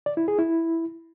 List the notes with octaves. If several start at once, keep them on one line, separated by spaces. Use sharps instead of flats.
D5
E4
G#4
E4